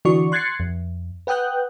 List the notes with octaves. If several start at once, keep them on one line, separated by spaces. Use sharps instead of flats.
D3 E3 F#4 D5 C#6
C6 F#6 G#6 A6 C7 C#7
F2
B4 F#5 G5 D#6 F#6 G6